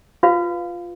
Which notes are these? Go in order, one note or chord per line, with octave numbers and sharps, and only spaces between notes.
F4 B4 F5